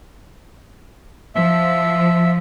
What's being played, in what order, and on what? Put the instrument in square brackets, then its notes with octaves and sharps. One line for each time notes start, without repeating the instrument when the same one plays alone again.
[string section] F3 [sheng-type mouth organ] E5